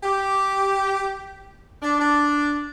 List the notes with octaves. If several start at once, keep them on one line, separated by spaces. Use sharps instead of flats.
G4
D4
D4